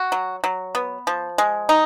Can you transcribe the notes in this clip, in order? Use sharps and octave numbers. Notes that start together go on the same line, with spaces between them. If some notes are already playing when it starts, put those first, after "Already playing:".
Already playing: F#4
F#3
F#3
B3
F3
G#3
D#4